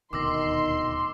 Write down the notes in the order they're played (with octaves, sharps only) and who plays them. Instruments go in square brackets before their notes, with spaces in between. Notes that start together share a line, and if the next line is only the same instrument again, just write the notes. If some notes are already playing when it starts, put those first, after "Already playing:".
[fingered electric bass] D#1 D2 B2 [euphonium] D#3 [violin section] C6 [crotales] D6 E6 A#6